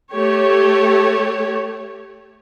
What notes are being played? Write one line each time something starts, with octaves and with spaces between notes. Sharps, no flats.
A3 G4 C#5